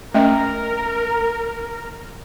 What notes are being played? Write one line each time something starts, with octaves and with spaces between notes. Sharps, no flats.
A3 C#4 A#4 D#5